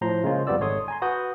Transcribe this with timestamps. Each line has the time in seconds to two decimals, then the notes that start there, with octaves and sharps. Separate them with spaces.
0.01 A2 F3 C5 A#5 C6
0.23 C#3 G#3 A#3 C#4 F4 C5
0.47 F2 G3 B3 F4 D5 E6
0.59 G#1 G#3 A4 C#5 C6 D#6
0.88 G#5 A#5 C6
1.02 F#4 B4 D#6 G6